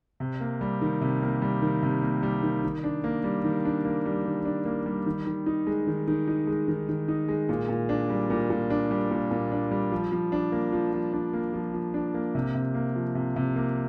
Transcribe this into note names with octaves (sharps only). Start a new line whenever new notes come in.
C3
A#3
G3
D#3
C3
A#3
G3
D#3
C3
A#3
G3
D#3
D#3
D4
A#3
G3
D#3
D4
A#3
G3
D#3
D4
A#3
G3
D#3
D#3
D#4
G#3
D#3
D#3
D#4
G#3
D#3
D#3
D#4
G#3
A#2
A#2
D4
G3
A#2
A#2
D4
G3
A#2
A#2
D4
G3
F3
F3
D4
A#3
F3
F3
D4
A#3
F3
F3
D4
A#3
C3
C3
A#3
F3
C3
C3
A#3